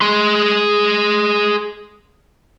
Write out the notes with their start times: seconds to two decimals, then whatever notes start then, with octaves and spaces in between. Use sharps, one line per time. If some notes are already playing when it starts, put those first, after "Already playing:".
0.01 G#4 C6